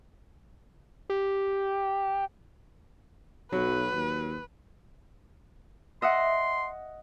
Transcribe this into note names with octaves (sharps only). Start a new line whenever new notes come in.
G4
B1 F#3 B4
D#2
D#5 E5 F#5 C6